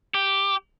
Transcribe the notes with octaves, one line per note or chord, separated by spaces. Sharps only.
G4